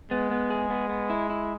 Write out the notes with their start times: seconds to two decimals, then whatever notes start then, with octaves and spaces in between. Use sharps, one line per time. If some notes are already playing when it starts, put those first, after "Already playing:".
0.11 G#3 B3
0.31 B3
0.50 G#4
0.70 B3
0.89 B3
1.10 E4
1.30 E4